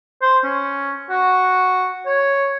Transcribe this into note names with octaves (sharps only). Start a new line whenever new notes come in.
C5
C#4
F#4
C#5